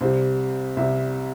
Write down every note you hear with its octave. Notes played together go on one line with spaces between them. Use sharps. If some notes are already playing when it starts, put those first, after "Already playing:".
C2 C3 G3 C5
C2 C3 G3 E5